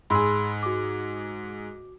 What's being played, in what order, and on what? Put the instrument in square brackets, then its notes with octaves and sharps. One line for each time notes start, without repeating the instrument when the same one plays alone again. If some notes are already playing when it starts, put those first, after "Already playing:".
[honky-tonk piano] G#2 G#4 [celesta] B5 C6 E6
[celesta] F#4 D6